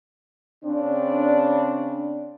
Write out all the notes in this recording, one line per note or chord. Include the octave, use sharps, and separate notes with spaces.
C#3 C4 D4